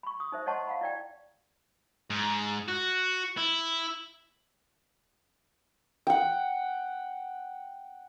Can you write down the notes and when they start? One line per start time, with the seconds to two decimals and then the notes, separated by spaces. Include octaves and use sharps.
0.03 B5 C#6
0.20 D#6
0.32 D#4 C5 E5
0.46 C#5 D#5 F#5 A5 C6 C#6
0.67 F5 F#5 B5
0.81 E4 D5 G5
2.10 G#2
2.68 F#4
3.37 E4
6.07 F#5 G5